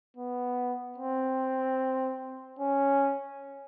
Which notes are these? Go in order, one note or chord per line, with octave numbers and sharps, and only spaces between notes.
B3
C4
C#4